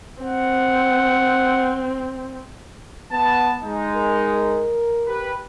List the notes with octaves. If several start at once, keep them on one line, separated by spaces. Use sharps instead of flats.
C4 F#5
B3 A5
G#3 D#4
A#4
G4 B4